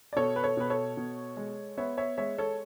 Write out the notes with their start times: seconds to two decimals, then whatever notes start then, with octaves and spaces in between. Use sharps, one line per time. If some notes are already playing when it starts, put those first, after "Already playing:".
0.13 D5
0.16 B2 A4 C#5
0.36 B4
0.43 A4 C#5
0.57 B2 B4
0.70 A4 C#5
0.97 B2
1.37 G#3
1.77 B3 C#5 E5
1.98 C#5 E5
2.18 G#3 C#5 E5
2.38 A4 C#5